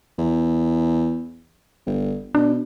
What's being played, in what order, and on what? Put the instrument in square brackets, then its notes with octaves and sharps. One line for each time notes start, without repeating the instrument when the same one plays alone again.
[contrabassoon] E2
G1
[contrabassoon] B2 [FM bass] D4